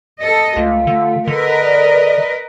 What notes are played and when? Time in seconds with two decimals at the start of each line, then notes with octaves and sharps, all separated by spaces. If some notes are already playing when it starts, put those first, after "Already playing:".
0.19 A4 D#5
0.56 C#2 A3 F4
0.87 D3
1.27 D3 A#4 B4 D#5
1.62 D5